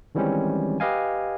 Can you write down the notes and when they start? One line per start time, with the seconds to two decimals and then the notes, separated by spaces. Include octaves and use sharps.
0.15 D#3 E3 G3 G#3 C4 C#4
0.80 G4 B4 D#5 F5 G#5